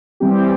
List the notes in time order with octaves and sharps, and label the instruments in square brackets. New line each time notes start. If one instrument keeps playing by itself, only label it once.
[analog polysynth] E3 G3 C4 G4